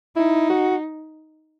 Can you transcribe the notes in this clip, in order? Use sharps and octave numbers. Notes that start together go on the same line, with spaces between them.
D#4 E4
F#4